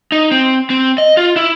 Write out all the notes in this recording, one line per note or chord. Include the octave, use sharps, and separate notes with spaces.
D#4
C4
C4
D#5
F4
E4